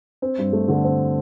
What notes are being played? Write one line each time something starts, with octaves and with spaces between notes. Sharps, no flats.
C4
G2
A3
D3
C4